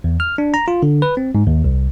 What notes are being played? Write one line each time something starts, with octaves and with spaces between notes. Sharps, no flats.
E2
F6
D4
A#5
F4
D3
B4
C4
G#2
D#2
C2